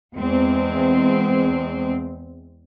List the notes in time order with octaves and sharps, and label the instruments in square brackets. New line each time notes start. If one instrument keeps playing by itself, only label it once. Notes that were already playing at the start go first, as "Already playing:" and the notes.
[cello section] E2 G#3 C4